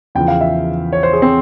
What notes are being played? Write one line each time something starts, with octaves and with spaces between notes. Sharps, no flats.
E2 C#3 F3 G5
F5
E5
C#5
C5
G#4
C4